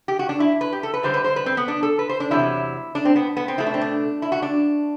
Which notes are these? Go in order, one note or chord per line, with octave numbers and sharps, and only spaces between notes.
G4
F#4
D4
E4
B4
G4
A4
B4
F#2 D3 G3 C5
B4
C5
B4
C4
B3
D4
A4
B4
C5
D4
E2 C3 F#3 E4
D4
C4
B3
B3
C4
B2 A3 E4
D4
C4
D4
E4
F#4
D4